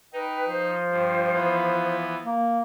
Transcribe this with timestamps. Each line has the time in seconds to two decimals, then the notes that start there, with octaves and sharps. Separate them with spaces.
0.13 D#4 B4 G5
0.48 F3 C5
0.90 G2
1.33 E3 B3
2.25 A#3